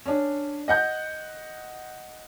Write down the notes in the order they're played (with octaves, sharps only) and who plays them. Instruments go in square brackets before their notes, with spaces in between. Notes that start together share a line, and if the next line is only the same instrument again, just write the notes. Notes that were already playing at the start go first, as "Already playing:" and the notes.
[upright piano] C#4 D4
D#5 F#5 G6